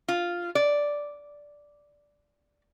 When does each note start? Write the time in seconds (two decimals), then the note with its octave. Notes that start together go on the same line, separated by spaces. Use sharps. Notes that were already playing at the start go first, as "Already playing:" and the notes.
0.08 F4
0.55 D5